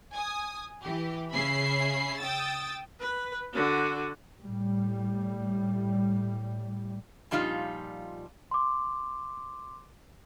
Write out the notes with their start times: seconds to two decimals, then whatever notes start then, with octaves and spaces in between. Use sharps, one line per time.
0.13 G#5 D#6
0.83 E3 G4
1.31 C#3 C#4 E5 B5 C7
2.19 G5 D#6 E6 A6
3.00 B4
3.53 D3 F#4
4.41 A2 G3
7.31 A#2 F3 G3 D#4 F4
8.51 C6 D6